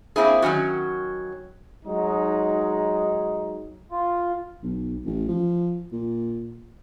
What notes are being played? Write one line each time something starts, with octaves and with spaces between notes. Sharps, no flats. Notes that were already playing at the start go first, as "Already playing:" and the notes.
A#3 C4 E4 G#4
D#3 F#3 C#4 F#4
F#3 G#3 D#4
F4
B1
A1
F3
A#2